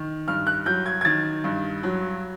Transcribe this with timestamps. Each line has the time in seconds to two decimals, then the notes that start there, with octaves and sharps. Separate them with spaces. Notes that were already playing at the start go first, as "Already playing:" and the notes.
Already playing: D#3
0.28 G2 F6
0.47 F#6
0.66 F#3 G6
0.86 G#6
1.01 G#6
1.05 D#3 A6
1.44 G2
1.83 F#3